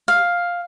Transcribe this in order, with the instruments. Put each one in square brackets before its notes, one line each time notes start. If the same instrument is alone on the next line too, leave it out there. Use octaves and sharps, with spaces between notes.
[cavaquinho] F5